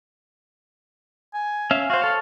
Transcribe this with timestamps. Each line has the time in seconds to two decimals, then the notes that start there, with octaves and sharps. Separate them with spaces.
1.34 G#5
1.71 C#4 E5 F5
1.90 F#4 C5 F5
2.02 A4 C#5